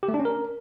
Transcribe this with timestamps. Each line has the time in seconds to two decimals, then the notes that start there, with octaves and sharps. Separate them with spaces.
0.03 G4
0.08 A3
0.14 D4
0.20 C#4
0.25 A#4